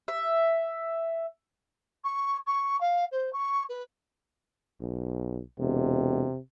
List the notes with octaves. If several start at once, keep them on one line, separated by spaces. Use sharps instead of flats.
E5
C#6
C#6
F5
C5
C#6
B4
B1
E1 C3